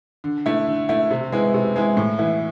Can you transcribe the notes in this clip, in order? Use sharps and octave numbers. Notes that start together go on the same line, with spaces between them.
D3
A3 E4
D3
A3 E4
C3
G#3 B3 E4
C3
G#3 B3 E4
A2
E3 B3 E4